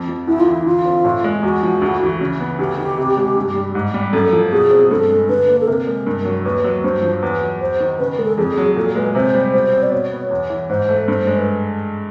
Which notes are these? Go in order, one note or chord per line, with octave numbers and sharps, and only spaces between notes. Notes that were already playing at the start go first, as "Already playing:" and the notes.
Already playing: F2
F3
D2 E4
F4
E3 E4
D3 F4
C4
A2
G#3
E2 F#4
F3
D2
E3
C#3
B3
D2 G4
D#3
C3
G#3
G2
G3
G#2
G3
F#2 A4
F3
B2 G#4
C4
G2 A4
G#3
D3 B4
A#3
A4
C3 A#4
G#3
G2
F#3
D#2 B4
F#3
G2 C5
F3
E2 B4
F#3
E2 C5
D#3
C#3 B4
G#3 A#4
A4
F2 G#4
F#3
A#2 A4
G#3 B4
C3 C5
G3
B2 C5
C4
D5
B2 C#5
B3
E2
E3
G#2 C5
A3
G2 C5
G#3
B4